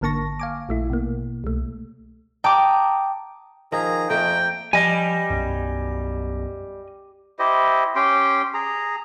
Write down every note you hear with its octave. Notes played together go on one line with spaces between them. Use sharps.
G#1 D3 A#3 A5 C#6 A#6
F5 G#5 D6
A#1 A3 E4
B2 A#3
C2 A3
G5 A5 A#5 D6 D#6
D#3 F3 G#4 A#5
F2 F3 A3 A#3 G5 A#5
F3 G3 D#5 G#5
B1 F#2
E4 G4 C5 D#5
C#4 G4 G5 C6
G#4 A#5